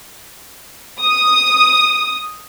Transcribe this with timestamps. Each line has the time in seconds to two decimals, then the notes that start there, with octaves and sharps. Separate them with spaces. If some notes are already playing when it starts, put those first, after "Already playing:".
1.01 D#6